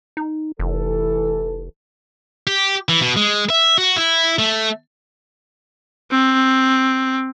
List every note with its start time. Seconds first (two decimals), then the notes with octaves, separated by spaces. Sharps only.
0.17 D#4
0.59 F1 E3 A4
2.47 G4
2.89 E3
3.01 B2
3.17 G#3
3.50 E5
3.78 F#4
3.96 E4
4.39 A3
6.11 C4